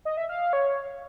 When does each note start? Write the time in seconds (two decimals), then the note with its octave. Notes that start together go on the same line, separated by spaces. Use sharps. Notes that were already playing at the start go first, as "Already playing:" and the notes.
0.05 D#5
0.17 E5
0.29 F5
0.41 F5
0.53 C#5